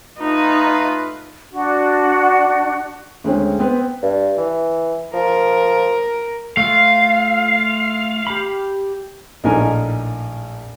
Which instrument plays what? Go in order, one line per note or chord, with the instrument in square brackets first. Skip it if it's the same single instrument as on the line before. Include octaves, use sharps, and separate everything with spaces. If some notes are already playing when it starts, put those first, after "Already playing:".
[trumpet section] A3 F4 B4 [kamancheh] D#4
[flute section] D4 F#4
[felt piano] D2 G#3 C4 C#4
B3 C4 B4
[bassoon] G2
E3
[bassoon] F3 [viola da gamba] A#4
[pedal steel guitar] A3 F4 [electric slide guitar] F5
[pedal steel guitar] G4 B5
[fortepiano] A#1 A2 D#4 A#4 G#5